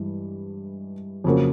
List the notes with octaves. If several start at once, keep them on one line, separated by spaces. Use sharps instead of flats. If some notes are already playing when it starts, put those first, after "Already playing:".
Already playing: G2 E3 G#3
F2 C#3 F#3 A#3